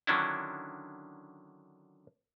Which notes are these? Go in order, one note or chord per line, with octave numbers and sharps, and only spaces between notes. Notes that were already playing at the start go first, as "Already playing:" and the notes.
D3 D#3 F#3 C#4 D4 E4